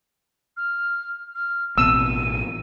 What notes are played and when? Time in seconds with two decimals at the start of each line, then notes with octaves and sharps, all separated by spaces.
0.57 F6
1.35 F6
1.78 A1 B2 C4 E6 D#7